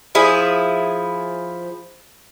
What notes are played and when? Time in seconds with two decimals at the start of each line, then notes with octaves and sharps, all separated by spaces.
0.15 F3 E4 G#4